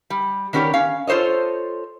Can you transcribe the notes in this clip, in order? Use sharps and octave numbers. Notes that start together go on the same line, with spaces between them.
G3
D#3 B3 C#4 G4 A#4 D5
C#4 F5
F4 A4 C5 C#5 D#5